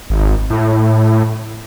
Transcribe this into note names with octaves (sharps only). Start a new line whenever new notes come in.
G#1
A2